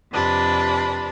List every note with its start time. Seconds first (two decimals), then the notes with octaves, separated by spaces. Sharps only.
0.12 F2 C3 D4 B4